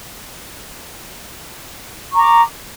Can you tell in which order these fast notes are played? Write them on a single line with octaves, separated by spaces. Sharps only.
C#6 A#5 D6